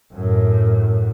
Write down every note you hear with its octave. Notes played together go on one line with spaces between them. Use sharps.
F#2 A2